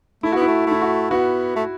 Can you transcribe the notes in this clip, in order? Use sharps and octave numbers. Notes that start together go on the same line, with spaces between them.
A3 E4
B3 F#4
E4
A3
A3 E4
F#4
B3 F#4
A3